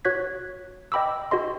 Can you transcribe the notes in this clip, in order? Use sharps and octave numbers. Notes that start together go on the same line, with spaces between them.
F#4 C#5 F#6 G#6 B6
D#5 G5 B5 D6 E6
F#4 G#4 D#5 C6